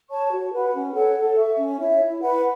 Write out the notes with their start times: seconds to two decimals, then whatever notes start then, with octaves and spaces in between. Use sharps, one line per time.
0.10 C#5 A5 C#6
0.31 F#4
0.52 B4 F#5 B5
0.74 C#4
0.94 A4 C#5 F#5
1.16 A4
1.37 E5 C#6
1.59 C#4
1.79 E4 C#5 E5
2.01 E4
2.22 B4 F#5 B5